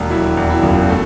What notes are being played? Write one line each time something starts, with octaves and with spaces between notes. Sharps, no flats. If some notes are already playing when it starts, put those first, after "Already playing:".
Already playing: E1 D#2
F#3 E4
E2
E4
F#1
A3